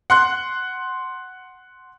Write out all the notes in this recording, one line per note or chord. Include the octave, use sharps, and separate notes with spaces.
F#5 C6 F#6